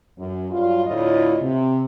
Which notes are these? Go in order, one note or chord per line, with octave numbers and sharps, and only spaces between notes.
F#2
G2 F#3 F4
D2 A2 E4 F4 C#5 D#5
C3